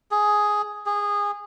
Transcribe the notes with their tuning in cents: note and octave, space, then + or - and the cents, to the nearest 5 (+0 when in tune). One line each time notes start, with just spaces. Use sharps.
G#4 +5
G#4 -20